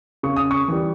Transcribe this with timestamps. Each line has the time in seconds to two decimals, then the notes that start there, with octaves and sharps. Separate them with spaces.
0.23 C#3 C#6
0.36 D#6
0.51 C#6
0.68 E3 G3